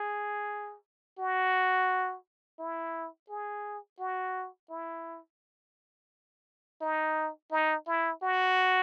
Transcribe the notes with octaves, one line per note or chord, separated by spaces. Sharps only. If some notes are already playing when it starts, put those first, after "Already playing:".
Already playing: G#4
F#4
E4
G#4
F#4
E4
D#4
D#4
E4
F#4